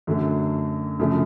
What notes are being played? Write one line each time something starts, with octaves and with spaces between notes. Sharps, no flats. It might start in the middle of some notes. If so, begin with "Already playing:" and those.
F#2 D3 F#3 A3
F#2 C#3 F3 A3 D4